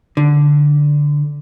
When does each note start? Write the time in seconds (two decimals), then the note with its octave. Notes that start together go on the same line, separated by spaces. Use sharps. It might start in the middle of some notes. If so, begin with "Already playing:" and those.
0.17 D3